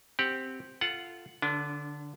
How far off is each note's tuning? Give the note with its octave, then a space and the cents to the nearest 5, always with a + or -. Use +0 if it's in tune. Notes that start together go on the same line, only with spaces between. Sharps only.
C4 +0 G4 +0 F#5 +5
F4 -15 A4 +0 F#5 +0
D3 +0 D4 -35 B4 -15